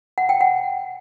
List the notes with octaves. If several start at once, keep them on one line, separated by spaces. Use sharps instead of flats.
F#5
G5
F#5